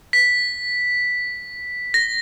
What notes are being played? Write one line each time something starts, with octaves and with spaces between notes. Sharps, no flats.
B6
A#6